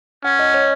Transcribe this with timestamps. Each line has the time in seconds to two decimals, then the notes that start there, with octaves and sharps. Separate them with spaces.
0.24 C#4 F#5
0.39 D#5
0.54 C#5